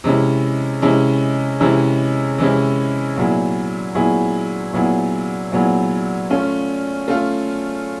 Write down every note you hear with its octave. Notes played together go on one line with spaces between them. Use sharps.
C3 E3 G#3 C#4 E4
C3 E3 G#3 C#4 E4
C3 E3 G#3 C#4 E4
C3 E3 G#3 C#4 E4
A#2 F#3 B3 E4 G#4
A#2 F#3 B3 E4 G#4
A#2 F#3 B3 E4 G#4
A#2 F#3 B3 E4 G#4
A3 C#4 F4
A3 C#4 F4